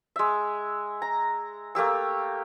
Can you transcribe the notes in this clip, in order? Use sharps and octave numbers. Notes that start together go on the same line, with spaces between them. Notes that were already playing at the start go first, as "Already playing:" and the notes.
G#3 E5
A#5
A3 A#3 G4 E6